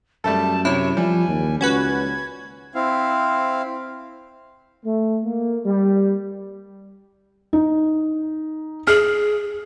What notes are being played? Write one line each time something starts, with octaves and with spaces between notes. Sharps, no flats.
F#2 G3 A3 A4 A5
C3 E4 C#5
F3 G3 G#5
D#2
C#2 C#4 F#4 B4 G#6
C4 E4 F5
A3
A#3
G3
D#4
G#4 F6